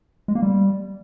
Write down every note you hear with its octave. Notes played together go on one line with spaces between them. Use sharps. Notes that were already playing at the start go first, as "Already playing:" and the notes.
G#3
A#3
G3